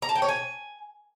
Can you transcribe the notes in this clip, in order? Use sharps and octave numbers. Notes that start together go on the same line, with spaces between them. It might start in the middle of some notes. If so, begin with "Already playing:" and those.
A#5
A5
G5
C#5
G#5